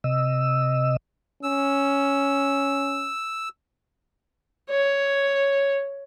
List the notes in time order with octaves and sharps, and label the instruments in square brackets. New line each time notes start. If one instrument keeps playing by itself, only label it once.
[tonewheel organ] C3 D#5 E6
[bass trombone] C#4 [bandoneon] E6
[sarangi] C#5